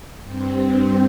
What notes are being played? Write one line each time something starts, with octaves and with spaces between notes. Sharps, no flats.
G2 C4